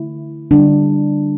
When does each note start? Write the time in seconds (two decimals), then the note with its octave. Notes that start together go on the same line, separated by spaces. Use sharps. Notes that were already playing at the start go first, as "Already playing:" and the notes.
Already playing: D3 A3 E4
0.51 D3 G3 D4